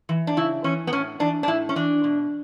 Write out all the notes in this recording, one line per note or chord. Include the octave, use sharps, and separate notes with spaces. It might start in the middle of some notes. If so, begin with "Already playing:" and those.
E3
D4
C#3 E4
E3 C#4
B3
A2 C#4
E3 D4
D4
A2 E4
C#4
E3 D4
B2